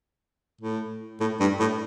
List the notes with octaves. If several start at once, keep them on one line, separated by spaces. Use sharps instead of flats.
A2
A2
G2
A2